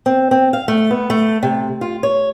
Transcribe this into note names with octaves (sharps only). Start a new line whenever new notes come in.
C4
C4
F5
A3
B3
A3
C3
F4
C#5